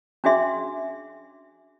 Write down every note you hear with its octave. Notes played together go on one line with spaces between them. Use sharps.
C#4 D4 F#4 G#4 E5 C6